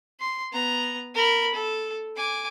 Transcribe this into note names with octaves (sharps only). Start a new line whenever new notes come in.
C6
B3 A#5
A#4 B5
A4
G#5 D6